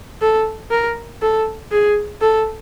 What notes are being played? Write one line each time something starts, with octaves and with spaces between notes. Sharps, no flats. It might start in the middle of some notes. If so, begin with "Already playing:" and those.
A4
A#4
A4
G#4
A4